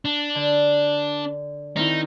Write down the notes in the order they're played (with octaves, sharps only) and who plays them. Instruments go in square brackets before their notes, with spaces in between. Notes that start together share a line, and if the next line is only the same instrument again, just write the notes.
[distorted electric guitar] D4
[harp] D3
[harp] D#3 C4 E4 [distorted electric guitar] D#4